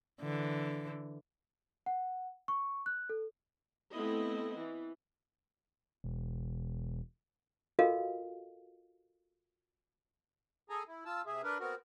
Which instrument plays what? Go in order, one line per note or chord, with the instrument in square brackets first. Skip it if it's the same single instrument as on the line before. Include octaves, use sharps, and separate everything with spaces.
[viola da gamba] D3 E3
[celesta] F#5
C#6
F#6
A4
[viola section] A3 B3 C4 E4 D#5
E3
[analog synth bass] E1
[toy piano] F4 F#4 A4 A#4 D#5 F5
[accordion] G#4 A4 G#5 A#5
E4
F4 A5 E6
C3 G#4 E5
D4 A#4 B4
B3 C4 F#4 A#4